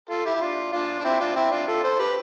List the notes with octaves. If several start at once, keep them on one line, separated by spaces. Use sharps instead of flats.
F4 A4
E4 G4
E4
D4 F4
D4 F4
D4
C4 E4
D4 F4
C4 E4
D4 F4
F4 A4
A4 C5
G4 B4